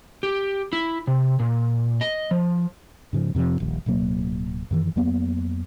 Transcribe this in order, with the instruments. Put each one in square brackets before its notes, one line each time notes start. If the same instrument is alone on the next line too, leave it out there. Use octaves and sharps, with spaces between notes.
[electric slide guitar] G4
E4
C3
A#2
D#5
F3
[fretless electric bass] G#2 C#3 F3
F2 C3 E3 F3
D#1 A#1 D#2
D1 B2 F#3 A#3
F#2 D#3 E3
F2 F#3 A#3 B3